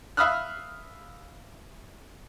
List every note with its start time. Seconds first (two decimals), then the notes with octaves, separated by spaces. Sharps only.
0.17 E5 F5 B5 D#6 F6 F#6